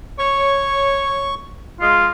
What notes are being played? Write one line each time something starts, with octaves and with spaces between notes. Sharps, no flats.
C#5 C#6
G#3 F4